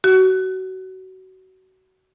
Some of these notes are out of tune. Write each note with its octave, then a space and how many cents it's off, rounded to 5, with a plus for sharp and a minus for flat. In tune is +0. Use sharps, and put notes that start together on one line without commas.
F#4 +25